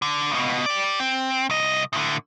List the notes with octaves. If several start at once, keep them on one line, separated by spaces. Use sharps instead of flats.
D3
C#2 B2
G4 D5
C4
C2 D#5
A2 D3